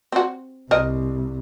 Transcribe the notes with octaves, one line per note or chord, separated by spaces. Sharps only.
C4 F#4
C2 A#4 D#5